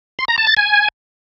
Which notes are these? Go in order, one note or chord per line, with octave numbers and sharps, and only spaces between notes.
C6
A#5
A5
A6
G#5